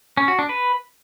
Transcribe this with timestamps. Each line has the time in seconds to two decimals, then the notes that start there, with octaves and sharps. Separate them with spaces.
0.17 C#4
0.28 F#4
0.39 D4
0.49 B4